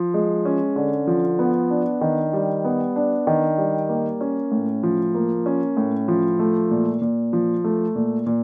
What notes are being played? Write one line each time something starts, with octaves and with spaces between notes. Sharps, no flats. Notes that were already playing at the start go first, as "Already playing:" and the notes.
Already playing: F3
G#3
C#4
D3
F3
B3
D4
D#3
G3
B3
D4
D#3
G3
A#3
C#4
A2
F3
A#3
C#4
A2
F3
A3
A#2
A#2
F3
A3
A#2
A#2